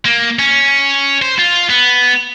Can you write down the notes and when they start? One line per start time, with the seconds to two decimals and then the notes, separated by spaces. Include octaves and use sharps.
0.05 A#3
0.39 C#4
1.22 C5
1.39 F4
1.70 B3